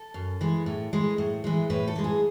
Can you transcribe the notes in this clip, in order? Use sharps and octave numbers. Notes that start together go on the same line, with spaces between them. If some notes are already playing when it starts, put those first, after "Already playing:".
Already playing: A4
F#2
E3 G#3
A2
E3 G#3
A2
E3 G#3
A2 B4
A4
E3 G#3
G#4